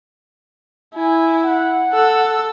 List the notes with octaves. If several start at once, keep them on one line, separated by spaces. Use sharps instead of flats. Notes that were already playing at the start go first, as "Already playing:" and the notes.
E4 G#5
F#5
A4 E6